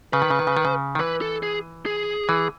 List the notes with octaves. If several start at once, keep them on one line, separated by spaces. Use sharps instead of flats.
C#3 B4
D#3
C#3
D#3
C#3
D#3
C#3
D#3
E3 B4
A4
G#4
G#4
E3